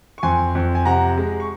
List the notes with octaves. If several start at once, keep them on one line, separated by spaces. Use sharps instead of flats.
C#6
F2 G#5 C6
F2
G#5
C3 F#5 A#5
G#3
C#6